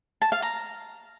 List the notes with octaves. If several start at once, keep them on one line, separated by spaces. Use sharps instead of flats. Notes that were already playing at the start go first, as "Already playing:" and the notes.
A5
F5
A#5